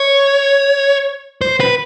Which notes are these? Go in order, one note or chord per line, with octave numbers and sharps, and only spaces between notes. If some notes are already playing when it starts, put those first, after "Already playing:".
Already playing: C#5
C5
B4